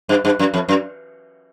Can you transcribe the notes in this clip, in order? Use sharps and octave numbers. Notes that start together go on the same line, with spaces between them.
G2
G2
F#2
F2
F#2